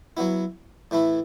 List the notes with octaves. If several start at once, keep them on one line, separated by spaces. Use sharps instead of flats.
F#3 B3 E4
A2 E3 A3 E4